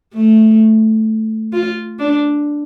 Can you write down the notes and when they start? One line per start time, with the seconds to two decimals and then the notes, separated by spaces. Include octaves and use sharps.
0.14 A3
1.53 F4
1.99 D4